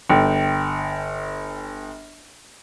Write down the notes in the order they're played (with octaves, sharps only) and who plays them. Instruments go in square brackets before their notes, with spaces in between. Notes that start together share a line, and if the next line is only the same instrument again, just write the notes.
[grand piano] G1 [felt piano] G5